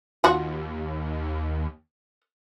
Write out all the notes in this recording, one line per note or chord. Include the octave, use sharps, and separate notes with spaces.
D#2 F4 F#4